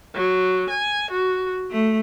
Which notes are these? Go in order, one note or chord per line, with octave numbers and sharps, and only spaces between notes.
F#3
G#5
F#4
A3